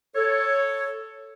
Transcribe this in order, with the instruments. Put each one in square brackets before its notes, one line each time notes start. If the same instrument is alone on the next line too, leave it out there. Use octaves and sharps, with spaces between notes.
[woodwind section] A4 C#5